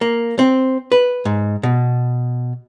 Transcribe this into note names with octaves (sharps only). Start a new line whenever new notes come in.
A#3
C4
B4
G#2
B2